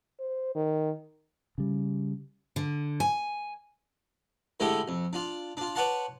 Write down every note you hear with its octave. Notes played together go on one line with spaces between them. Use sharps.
C5
D#3
C#3 G3
D3
G#5
A2 D3 G#3 A3 E4 G4
F2
D4 F4
D4 F4
B4 C#5 D5 F#5 A5 C6